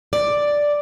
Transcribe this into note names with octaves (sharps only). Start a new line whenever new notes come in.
D5